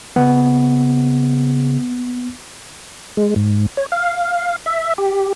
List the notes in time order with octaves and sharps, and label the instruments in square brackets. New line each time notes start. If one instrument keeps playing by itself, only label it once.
[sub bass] C#3 [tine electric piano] B3
[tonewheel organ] G#3
G#2
C#5
F5
E5
G4